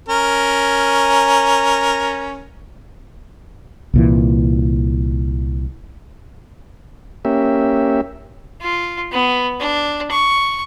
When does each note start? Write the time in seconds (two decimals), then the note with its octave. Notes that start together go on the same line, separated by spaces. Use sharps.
0.09 C#4 A#4
3.94 C2 A#2 E3
7.25 A#3 C#4 G4 E5
8.61 F4
9.12 B3
9.60 D4
10.11 C#6